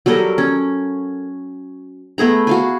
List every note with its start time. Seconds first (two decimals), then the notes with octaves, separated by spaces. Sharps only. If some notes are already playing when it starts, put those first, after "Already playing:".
0.06 F#3 G3 A4 A#4
0.38 C#4
2.18 A3 B3 G#4 A#5
2.47 F#4 F5 G#5